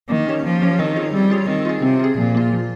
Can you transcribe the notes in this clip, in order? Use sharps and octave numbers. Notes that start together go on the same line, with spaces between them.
D#3 A#3
C#4 G4 C#5
F3 A#3
C#4 G4 C#5
D#3 C4
F4 G#4 C#5
G3 C4
F4 G#4 C#5
D#3 C4
F4 G#4
C3 C4
F4 G#4
A#2 F3
A#3 F4
F3